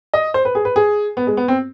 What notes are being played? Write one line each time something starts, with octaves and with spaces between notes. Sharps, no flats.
D#5
C5
B4
G#4
B4
G#4
B3
G#3
B3
C4